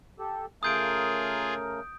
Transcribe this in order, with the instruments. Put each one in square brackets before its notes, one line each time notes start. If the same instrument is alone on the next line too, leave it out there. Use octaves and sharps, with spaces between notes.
[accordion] G4 A4
[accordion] C#3 A3 A#4 [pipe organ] F4 G#4 [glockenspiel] D#6 G6 D7